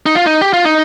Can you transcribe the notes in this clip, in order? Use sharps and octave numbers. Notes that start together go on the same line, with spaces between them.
D#4
F4
D#4
G4
F4
D#4